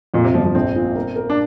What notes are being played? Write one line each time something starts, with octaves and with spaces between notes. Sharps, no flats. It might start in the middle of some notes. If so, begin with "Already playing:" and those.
F2 A#2
C3
G1 F3
F3
A#1 C4
A#2
A#4
A#4
D4